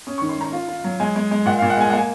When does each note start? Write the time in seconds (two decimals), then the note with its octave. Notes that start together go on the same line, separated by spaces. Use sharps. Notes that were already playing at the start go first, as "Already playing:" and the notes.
0.07 C#4 D#6
0.18 C#6
0.22 D#3
0.29 C6
0.38 D#3 A#5
0.52 F4
0.68 F4
0.84 F#3
1.00 G#3 G#5
1.16 G#3
1.31 G#3
1.46 A#2 F#5
1.58 F5
1.62 A#2
1.70 F#5
1.77 G#3 G#5
1.90 A#3 F#5
1.98 G#5